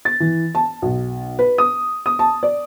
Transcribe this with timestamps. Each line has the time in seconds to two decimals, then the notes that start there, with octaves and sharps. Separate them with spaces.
0.05 A6
0.20 E3
0.55 A5
0.82 B1
1.39 B4
1.58 D#6
2.06 D#6
2.19 A5
2.43 D5